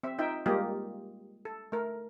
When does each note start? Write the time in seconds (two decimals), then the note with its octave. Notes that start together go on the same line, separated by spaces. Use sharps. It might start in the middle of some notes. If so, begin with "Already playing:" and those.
0.03 C4 E5
0.19 D#4 F4 E5 G5
0.46 G3 G#3 A#3 F4 G4 D#5
1.45 A4
1.72 A3 A#4